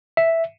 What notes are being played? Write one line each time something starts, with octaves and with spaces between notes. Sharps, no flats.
E5